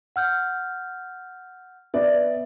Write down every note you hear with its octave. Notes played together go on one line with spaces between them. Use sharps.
F#5 F6 G6
B3 D5 E5